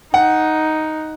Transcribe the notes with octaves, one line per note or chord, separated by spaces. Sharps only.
D#4 F#5